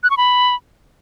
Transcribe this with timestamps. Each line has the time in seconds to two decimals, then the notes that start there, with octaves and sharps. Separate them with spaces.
0.03 F#6
0.10 C#6
0.17 B5